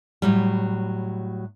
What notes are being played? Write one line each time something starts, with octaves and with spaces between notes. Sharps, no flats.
A2 F#3 G3